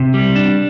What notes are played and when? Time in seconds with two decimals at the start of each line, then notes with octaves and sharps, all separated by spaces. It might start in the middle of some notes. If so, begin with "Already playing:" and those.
Already playing: C3
0.14 G3
0.36 D4